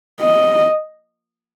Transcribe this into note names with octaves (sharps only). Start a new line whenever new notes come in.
D#5